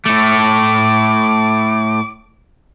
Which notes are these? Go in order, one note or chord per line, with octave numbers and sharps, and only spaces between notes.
A2 A3 D6